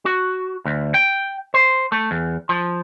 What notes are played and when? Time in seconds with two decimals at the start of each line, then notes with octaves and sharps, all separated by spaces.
0.05 F#4
0.65 D2
0.94 G5
1.54 C5
1.92 A3
2.11 E2
2.49 F3